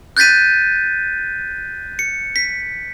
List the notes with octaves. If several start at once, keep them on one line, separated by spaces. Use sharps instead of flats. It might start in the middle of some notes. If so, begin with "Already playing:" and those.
F#6 G6 A6 B6 D#7
C#7
B6